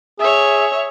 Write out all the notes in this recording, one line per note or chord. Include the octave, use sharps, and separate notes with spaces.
G#4 C#5 E5